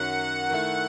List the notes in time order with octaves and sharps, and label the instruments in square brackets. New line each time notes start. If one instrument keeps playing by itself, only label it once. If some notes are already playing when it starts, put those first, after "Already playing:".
Already playing: [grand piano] F#2 D#3 F#3 [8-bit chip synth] F#5
[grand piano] D#3 A3 E4